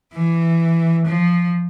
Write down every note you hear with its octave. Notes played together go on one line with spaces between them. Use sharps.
E3
F3